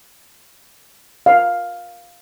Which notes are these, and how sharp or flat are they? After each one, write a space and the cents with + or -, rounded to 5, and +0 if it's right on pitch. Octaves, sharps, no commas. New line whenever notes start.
F5 +5